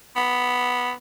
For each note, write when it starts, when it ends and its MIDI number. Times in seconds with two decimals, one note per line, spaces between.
0.16 0.92 59